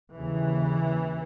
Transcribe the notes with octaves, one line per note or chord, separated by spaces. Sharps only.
D#2 C#3 E3